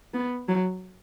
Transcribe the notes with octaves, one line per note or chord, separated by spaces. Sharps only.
B3
F#3